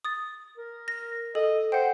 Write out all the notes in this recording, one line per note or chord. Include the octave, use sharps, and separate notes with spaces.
D#6 A6
A#4
A#6
A4 D#5
C5 F#5 G5